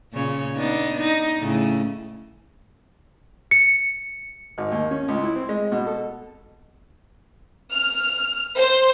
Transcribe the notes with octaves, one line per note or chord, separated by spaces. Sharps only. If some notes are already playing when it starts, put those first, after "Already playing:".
A#2 C#3 C#5
B3 D4 D#4
D#4
A2 C#3
C#7
G#1
D#2
C#4
C#2
E4
C4
G#3
B2
A4
F6
C5